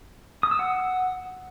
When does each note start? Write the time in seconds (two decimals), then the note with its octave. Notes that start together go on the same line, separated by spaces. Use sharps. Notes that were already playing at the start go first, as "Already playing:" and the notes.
0.43 D#6
0.51 E6
0.59 F#5